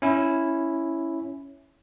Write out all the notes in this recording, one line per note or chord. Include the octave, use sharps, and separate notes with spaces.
C#4 E4